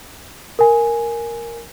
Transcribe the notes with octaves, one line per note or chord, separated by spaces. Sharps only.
A#4 G#5